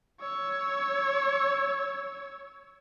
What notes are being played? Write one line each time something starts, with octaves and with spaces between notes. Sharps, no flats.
C#5 E6